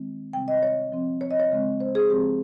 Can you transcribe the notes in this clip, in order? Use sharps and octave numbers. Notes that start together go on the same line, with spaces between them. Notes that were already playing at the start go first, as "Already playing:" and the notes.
Already playing: D#3 G#3 C4
C3 G3 C4 G5
D#5
C#5
F3 C4
C#5
D#5
C#5
C#3 G#3 C4
C5
G#4
C#3 F3 G#3 C4 G4